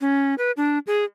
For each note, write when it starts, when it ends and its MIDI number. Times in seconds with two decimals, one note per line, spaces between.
0.01 0.35 61
0.38 0.51 71
0.57 0.79 62
0.87 1.04 68